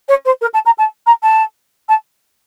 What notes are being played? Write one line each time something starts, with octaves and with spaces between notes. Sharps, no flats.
C#5
C5
A#4
A5
A#5
A5
A#5
A5
A5